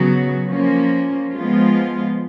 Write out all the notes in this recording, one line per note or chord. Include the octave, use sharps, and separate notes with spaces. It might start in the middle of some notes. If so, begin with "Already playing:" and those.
Already playing: C#3 F#3 B3 F#4
F3 A#3 C#4
F3 G#3 B3 F4